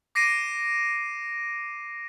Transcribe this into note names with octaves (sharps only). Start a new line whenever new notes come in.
D6 A#6 C7 D7 D#7